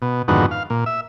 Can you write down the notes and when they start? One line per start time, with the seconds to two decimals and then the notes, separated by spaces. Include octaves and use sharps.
0.02 B2
0.28 F2 G#2 D3 D#3 B3 F#4
0.51 F5
0.70 A#2
0.86 E5